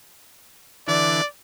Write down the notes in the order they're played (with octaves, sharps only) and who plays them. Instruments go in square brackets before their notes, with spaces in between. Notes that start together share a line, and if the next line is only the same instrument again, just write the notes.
[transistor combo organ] D3 E3 [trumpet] D5